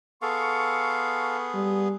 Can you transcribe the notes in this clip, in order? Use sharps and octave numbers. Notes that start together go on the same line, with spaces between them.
B3 G#4 A4 F5 C6 C#6
G3